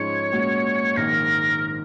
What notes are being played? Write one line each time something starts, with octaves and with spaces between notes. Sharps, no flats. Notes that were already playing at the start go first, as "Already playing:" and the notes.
Already playing: G#2 F3 G#3 C#4 G#4 C#5
A#2 G#3 C#4 F#4
A#1 G#2 D#3 A#3 A#4